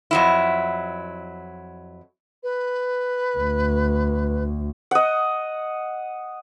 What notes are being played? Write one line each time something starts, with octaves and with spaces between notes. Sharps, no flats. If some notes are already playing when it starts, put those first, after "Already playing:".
F2 F#3 E4
B4
D2
D#5 F#5